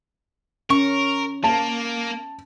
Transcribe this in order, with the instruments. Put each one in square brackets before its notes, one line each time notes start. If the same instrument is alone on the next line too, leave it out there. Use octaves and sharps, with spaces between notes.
[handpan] C#4 [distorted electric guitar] A#4 [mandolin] C#6
[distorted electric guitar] A#3 [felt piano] A5